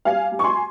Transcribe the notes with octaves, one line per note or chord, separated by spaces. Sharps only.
G3 F5 G#5
G3
C#6
G#5 C6